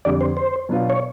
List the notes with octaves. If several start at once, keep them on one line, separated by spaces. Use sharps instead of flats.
F2 D3 G3 D5
C5
C5
B2 F#3 B3 D4 F4
C#5